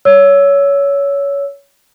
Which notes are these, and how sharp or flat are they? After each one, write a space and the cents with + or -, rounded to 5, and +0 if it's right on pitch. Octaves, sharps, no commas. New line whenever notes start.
C#5 +20 E6 +0